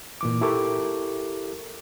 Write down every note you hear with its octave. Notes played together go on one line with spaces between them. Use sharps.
A#2 E3 D6
E4 G4 A4 A#4 C#6 D6